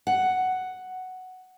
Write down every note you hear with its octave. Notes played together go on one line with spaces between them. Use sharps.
F#5